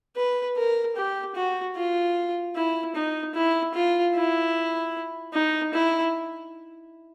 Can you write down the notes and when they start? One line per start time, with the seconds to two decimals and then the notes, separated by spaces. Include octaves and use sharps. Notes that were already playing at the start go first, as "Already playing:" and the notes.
0.16 B4
0.57 A#4
0.96 G4
1.35 F#4
1.76 F4
2.56 E4
2.95 D#4
3.34 E4
3.74 F4
4.15 E4
5.34 D#4
5.74 E4